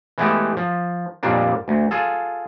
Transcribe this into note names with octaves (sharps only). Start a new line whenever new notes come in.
E3 G#3 A3 B3 G4 A4
F3
F2 A#2 G3 A#3 D4
D2
F4 G#4 A4